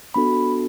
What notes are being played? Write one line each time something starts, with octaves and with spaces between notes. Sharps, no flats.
B3 D4 F#4 A4 B5